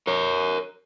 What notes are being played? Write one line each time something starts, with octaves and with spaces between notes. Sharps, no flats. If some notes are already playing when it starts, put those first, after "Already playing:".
A#4 C#5